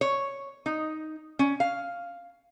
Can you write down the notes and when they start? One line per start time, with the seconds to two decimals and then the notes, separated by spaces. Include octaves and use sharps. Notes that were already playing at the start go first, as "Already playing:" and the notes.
0.01 C#5
0.66 D#4
1.39 C#4
1.60 F5